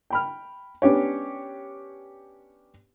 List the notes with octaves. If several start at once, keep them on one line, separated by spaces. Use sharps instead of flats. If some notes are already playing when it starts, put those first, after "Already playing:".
G5 B5 F6
B3 C#4 D4 G4 C#5